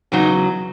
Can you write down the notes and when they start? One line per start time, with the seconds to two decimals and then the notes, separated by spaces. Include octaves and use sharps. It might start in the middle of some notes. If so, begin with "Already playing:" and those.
0.12 E2 C#3 F#3 D#4